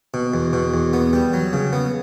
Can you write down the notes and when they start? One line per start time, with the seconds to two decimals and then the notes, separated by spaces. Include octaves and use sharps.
0.14 B2
0.34 E2
0.53 B2
0.74 E2
0.93 B3
1.13 G3
1.33 F#3
1.53 C#3
1.73 B3